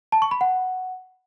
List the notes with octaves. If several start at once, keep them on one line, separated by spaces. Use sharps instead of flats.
A5
C#6
B5
F#5